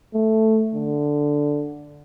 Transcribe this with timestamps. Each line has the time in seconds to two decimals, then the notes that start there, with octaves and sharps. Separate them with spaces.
0.14 A3
0.74 D3